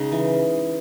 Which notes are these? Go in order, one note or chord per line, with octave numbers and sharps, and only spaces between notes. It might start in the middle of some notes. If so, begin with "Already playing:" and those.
Already playing: C#3 G#3 C#4 D#4
E3